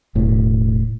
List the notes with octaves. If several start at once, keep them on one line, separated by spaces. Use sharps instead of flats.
E1 A2